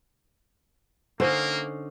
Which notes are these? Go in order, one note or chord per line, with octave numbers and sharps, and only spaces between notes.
D3 A#3 C#4 D#4 C5